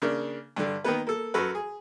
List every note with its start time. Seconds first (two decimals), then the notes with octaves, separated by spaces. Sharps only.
0.02 C#3 A#3 D4
0.56 G2 D3
0.84 D#3 A#3 B3 B4
1.07 A#3 A4
1.34 F#2 F#4 A4 B4
1.55 G#4